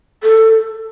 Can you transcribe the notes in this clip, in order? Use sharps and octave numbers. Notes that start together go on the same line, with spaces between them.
A4